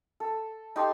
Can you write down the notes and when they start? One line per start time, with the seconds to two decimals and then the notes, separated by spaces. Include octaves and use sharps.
0.20 A4
0.76 D#4 G4 A4 C6